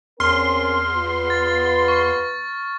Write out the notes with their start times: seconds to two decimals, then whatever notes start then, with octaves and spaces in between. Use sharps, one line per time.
0.20 E2 C4 C#4 A#4 C6 F6
0.94 B3 F4 B4
1.30 A6
1.88 C#6